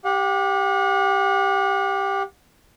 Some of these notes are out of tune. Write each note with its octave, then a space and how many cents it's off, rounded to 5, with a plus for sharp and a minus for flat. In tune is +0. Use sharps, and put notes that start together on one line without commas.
G4 +0 F#5 -40